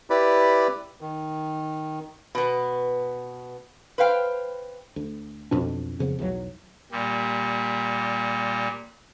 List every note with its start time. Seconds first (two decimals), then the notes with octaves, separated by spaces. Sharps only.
0.10 E4 G4 B4 D5 B5
1.01 D#3
2.35 B2 B3
3.98 B4 C5 F5 G5
4.96 D2
5.51 B1 F2 B2 D4
5.99 F2 C#3 F3 B3
6.19 B1 E2 D#3 F#3
6.92 A#2 G3